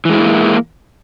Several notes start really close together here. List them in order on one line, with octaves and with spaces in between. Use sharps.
E3 G#3 E4 A#3